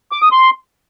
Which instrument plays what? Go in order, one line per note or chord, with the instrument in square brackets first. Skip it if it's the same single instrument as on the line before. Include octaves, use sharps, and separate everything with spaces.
[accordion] D6
D#6
C6